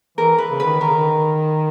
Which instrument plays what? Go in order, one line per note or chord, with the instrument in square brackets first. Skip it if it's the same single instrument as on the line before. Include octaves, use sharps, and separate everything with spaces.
[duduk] E3 [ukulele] A#4
[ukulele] B4
[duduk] C#3
[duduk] D#3 [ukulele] B4
[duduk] D#3 [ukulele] A#4
[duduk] C#3
D#3